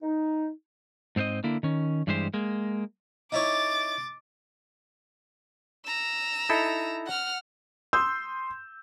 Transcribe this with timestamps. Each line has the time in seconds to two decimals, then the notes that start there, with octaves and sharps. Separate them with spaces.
0.03 D#4
1.16 G#2 C4 E4 C5 D#5
1.44 D3 A#3 E4
1.63 D#3 C#4
2.07 G2 E3 G3 G#3 G4 C5
2.34 G#3 A#3
3.32 D#4 E4 C#5 D6 A6
5.86 A#5 E6
6.49 D#4 E4 A4
7.07 F#5 F6
7.93 C6 D#6 E6 G6